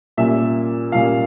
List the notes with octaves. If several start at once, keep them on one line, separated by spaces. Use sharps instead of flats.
A#2 G3 A#3 C#4 E5
A#2 G3 A#3 C#4 F5